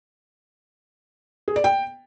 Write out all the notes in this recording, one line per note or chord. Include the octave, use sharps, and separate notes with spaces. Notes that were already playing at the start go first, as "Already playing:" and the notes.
G#4
D5
G5